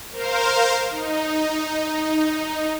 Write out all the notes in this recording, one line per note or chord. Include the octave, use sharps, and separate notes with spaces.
A#4 C5 F5
D#4